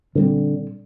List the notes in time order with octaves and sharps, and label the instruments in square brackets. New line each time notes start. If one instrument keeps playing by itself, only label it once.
[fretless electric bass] A#2 G3 C4 [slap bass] D3